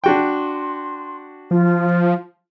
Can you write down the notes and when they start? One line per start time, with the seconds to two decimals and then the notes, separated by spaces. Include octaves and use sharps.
0.04 D4 F#4 G5 C6
1.51 F3 F4